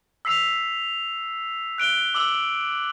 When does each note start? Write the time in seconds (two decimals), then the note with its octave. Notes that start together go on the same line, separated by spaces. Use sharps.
0.25 E6 B6 C7 F7
1.78 F#6 D7 G7
2.15 D6 E6 F#7